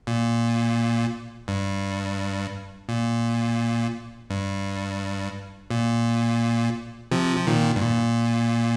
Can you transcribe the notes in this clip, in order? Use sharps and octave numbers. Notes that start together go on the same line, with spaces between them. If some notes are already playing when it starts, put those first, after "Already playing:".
A#2
G2
A#2
G2
A#2
C3 F3
F3
A#2 D#3
G2
A#2